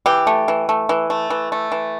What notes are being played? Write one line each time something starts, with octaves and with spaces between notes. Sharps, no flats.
E3 G4
A3
E3
A3
E3
A3
E3
A3
E3